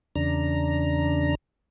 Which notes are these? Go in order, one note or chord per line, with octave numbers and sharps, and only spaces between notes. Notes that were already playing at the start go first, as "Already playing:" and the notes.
E2 C#3 D4 A#5